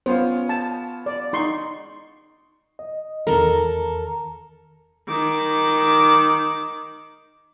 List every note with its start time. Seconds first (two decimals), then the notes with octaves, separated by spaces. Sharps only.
0.06 B3 C#4 F4 C5
0.49 A5
1.06 D5
1.33 D#4 C6 C#6
2.79 D#5
3.27 E2 D#3 A4 A#4
5.08 D#3 D6